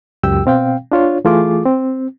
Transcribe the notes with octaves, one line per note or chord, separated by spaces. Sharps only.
C#2 F#2 G4 G5 E6
B2 C4 F5 G5
D4 F4 C#5
E3 A3 F4 G#4 D6
C4